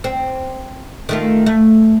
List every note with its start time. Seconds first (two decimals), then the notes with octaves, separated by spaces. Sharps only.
0.04 C4
1.09 D#3 A3 F4
1.46 A3